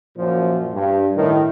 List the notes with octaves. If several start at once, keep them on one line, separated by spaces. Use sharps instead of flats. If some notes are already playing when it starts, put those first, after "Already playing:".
F#2 A#2 F3
G2
A2 D#3